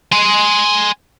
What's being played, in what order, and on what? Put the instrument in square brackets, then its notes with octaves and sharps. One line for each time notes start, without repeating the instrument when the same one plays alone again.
[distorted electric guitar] G#5 C6